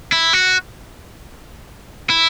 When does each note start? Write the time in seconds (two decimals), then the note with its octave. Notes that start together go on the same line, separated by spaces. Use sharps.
0.12 E4
0.33 F#4
2.10 E4